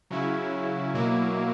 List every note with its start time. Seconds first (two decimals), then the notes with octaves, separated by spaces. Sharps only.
0.10 C#3 F#3 C#4 E4
0.94 B2 F#3 A#3 E4